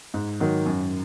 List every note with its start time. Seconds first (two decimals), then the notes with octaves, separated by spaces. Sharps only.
0.14 G#2
0.40 D#3 F#3
0.66 F#2